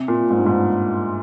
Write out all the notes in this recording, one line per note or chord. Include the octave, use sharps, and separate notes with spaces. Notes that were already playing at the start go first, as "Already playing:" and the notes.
Already playing: C3
A#2
G#2
G2
G#2